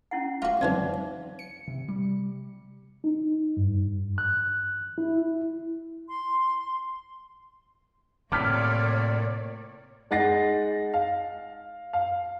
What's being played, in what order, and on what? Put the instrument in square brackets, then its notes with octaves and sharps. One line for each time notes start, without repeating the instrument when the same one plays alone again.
[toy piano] C#4 E4 F#5
[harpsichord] F4 F#4 [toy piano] E5 F5 D6
[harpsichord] F2 E3 F#3 [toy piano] D#4 D5
[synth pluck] C#7
C3
G3
[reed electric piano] D#4
G2
F#6
E4
[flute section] C6
[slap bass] A2 C3 [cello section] A#3 C#5 D5 [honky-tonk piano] D6 F6 B6
[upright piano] G#3 D#4 F#5 A6 A#6 C7
F5
F5